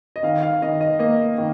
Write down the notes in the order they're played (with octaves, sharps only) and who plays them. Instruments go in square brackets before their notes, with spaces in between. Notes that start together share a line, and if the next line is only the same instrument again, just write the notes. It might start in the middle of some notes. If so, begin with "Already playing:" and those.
[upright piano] D#5
D#3 F5
F5
D#3 D#5
D#5
A#3 D#5
D#3